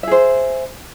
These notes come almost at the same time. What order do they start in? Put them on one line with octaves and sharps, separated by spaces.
E5 G#4 C5